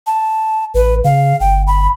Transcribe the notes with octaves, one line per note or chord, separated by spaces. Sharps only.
A5
A1 B4
C#3 F5
G1 G5
B5